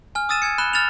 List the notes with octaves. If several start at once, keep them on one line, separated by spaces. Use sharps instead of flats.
G#5 F6
D#6 E6 A6 D#7 E7
G#5 G#6 C#7
B5 F#6 E7 G7
F6 A6 E7 F7